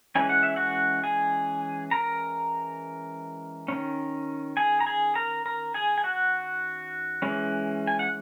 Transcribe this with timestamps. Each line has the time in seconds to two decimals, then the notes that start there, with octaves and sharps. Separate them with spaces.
0.15 E3 G#3 C#4 G#5
0.29 F#5
0.43 E5
0.56 F#4 F#5
1.04 G#4 G#5
1.91 A#4 A#5
3.68 D#3 A#3 C#4
4.57 G#4 G#5
4.80 A#5
4.87 G#4 G#5
5.15 A#4 A#5
5.46 A#4 A#5
5.74 G#4 G#5
5.98 G#5
6.04 F#4 F#5
7.22 E3 G#3 C#4
7.87 G#5
7.99 F#5